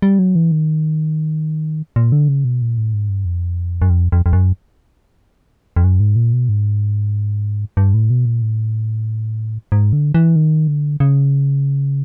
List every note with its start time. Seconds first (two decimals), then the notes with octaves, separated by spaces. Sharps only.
0.02 G3
0.19 F#3
0.35 E3
0.52 D#3
1.96 A#2
2.12 D3
2.28 C#3
2.45 B2
2.62 A#2
2.78 A2
2.94 G#2
3.09 G2
3.25 F2
3.82 F#2
3.90 F2
4.12 F2
4.26 F2
4.33 F#2
5.76 F2
5.84 F#2
6.00 G#2
6.16 A#2
6.33 B2
6.49 G#2
7.77 G2
7.94 A2
8.10 B2
8.25 A#2
8.42 A2
9.72 G#2
9.93 D3
10.14 E3
10.36 D#3
10.68 D3
11.00 C#3